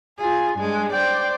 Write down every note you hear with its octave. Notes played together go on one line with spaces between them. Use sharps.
F4 G#4 G#5
G2 G#3
C5 D5 G5